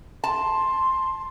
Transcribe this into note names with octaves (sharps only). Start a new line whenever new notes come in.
A5 C6